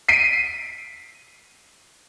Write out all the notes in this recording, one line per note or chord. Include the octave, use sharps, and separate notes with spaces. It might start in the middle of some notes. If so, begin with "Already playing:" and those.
B6 C7 D7 D#7